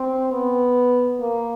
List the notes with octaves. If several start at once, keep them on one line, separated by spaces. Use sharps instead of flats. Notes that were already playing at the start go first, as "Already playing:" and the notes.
Already playing: C4
B3
A#3